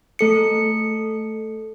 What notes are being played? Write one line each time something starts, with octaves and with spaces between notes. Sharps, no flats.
A3 A4 C#7